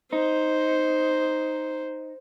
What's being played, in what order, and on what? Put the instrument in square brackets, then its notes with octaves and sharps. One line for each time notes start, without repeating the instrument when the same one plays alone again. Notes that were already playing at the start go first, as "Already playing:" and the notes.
[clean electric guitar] D#4 [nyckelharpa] C5